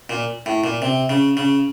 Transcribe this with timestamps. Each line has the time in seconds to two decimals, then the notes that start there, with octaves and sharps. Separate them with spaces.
0.10 A#2
0.46 A2
0.64 A#2
0.82 C3
1.10 C#3
1.37 C#3